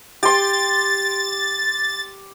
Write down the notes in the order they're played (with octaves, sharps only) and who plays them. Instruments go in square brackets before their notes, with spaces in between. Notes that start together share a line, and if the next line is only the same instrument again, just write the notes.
[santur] G4 C6 [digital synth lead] A6